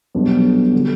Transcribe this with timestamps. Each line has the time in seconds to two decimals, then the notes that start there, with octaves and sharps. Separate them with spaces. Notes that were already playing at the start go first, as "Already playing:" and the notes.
0.14 B1 B2 G3 B3 D4
0.73 D3 G3